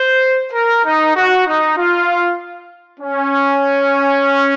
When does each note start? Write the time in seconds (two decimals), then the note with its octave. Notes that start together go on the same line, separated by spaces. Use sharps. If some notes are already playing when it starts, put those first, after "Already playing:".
Already playing: C5
0.53 A#4
0.85 D#4
1.16 F#4
1.47 D#4
1.78 F4
3.00 C#4